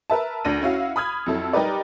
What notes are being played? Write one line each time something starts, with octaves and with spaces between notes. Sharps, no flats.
A#4 B4 E5 A5
D2 D4 A#6 D#7
C#4 E4 F#4 F5
B5 D#6 F6 G#6
F2 F#3 E4 A4
G3 D#4 G4 A#4 B4 D5